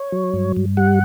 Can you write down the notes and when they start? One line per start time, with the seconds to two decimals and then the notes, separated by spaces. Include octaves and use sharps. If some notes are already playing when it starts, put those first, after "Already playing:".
Already playing: C#5
0.12 F#3
0.34 G2
0.56 G2
0.77 G3 F#5